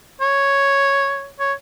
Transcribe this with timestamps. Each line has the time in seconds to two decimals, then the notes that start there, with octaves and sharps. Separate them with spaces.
0.21 C#5
1.40 C#5